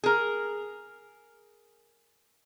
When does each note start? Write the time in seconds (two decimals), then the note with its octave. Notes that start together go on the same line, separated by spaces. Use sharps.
0.04 G#4 A#4